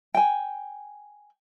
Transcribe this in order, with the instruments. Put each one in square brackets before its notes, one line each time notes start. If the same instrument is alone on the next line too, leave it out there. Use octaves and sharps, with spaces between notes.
[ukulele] G5 G#5